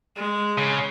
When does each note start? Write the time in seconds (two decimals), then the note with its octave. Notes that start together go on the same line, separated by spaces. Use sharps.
0.16 G#3
0.58 C#3